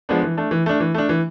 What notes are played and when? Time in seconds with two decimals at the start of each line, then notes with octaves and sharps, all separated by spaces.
0.09 F3 G#3 B3 D4
0.23 E3
0.37 A3 D4
0.51 E3
0.66 A3 D4
0.80 E3
0.94 A3 D4
1.09 E3